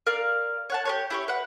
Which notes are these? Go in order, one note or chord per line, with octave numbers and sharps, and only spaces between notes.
A#4 D5 F5
C#5 F#5 A5
G4 B4 C#5
E4 G4 C#5
B4 F#5